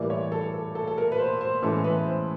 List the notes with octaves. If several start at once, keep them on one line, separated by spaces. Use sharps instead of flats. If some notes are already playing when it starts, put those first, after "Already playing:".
Already playing: A2 E3 G3 A#3 D5
C#5
A4
A4
A4
A4
A#4
B4
C5
C5
A2 E3 G#3 C#4 A4
B4
C5